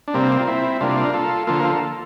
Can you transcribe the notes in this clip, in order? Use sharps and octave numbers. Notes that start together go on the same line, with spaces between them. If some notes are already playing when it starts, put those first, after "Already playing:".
D4
C3 G3 A#3 C4
F4
C4 E4
C3 G3 A#3 D4 F4
A#4
F4 A4
D3 F3 A#3 F4 A4
A#4
F4 A4